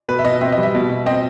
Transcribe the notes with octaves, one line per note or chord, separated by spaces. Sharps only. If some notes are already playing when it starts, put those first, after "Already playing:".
B2 B4
E5
B2 D#5
C4 E5
D#5
G3
E5
B2
B2
C4 D#5